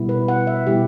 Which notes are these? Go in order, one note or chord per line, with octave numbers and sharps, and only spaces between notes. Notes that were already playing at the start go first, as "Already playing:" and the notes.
Already playing: B2 G3 B3 E4
B4
F#5
E5
B2 G3 B3 E4 G4